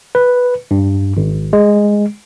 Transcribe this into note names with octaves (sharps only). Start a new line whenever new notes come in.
B4
G2
G#1
G#3